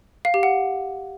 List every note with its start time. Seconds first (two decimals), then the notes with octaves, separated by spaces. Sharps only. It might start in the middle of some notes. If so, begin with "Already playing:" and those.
0.25 F5
0.34 G4
0.43 F#5